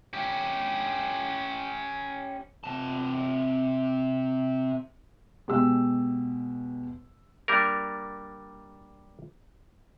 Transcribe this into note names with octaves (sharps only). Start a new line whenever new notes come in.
C#4 G4
C3 A5
B2 G#3 G4 E6
G3 A#3 D4 A#4